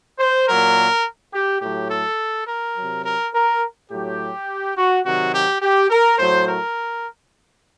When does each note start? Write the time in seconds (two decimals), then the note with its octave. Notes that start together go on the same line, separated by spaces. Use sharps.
0.19 C5
0.47 A#2 F#3 A#4
1.33 G4
1.62 A2 F#3 G4
1.90 A4
2.48 A#4
2.76 C3 F#3
3.05 A#4
3.33 A#4
3.90 A2 F#3 G4
4.77 F#4
5.05 C3 D#3 F#3 F#4
5.33 G4
5.62 G4
5.90 A#4
6.19 A2 F#3 C5
6.48 A#4